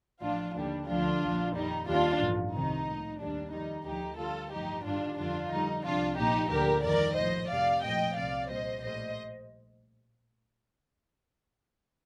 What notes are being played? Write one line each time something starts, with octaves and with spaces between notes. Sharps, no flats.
A1 A2 F3 D4 F4
D#2 D3 G3 D4
D2 D3 F3 D4 F4
A#1 A#2 F3
F2 D#3 G3 D#4
D#2 D#3 G3 D4 F4
A1 G2 F3
C2 C3 D#3 D#4
A#1 A2 F3
D#2 D#3 G3 D4
F2 D#3 G3 D#4
D2 D3 F3 D#4 G4
D2 D3 G3 F4 A4
A1 G2 F3 D#4 G4
G1 G2 D#3 G3 D4 F4
F2 D3 F3 D4 F4
F2 D3 G3 D#4
C2 C3 F3 D4 F4
A#1 A#2 F3 D#4 G4
D2 D3 F3 G4 A#4
F2 D#3 G3 A#4 D5
A#1 A2 F3 C5 D#5
F2 C3 G3 D5 F5
A#1 A2 F3 D#5 G5
C2 C3 F3 D5 F5
A#1 A#2 G3 C5 D#5
A#1 A2 G3 C5 D#5